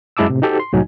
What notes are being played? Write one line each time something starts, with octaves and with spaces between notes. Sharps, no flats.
F#2 G#3 E4 A5 D6 E6
A2 C3
D#4 F#4 G4 A4 C5
C6
C2 A2 F#3 D#4 G#5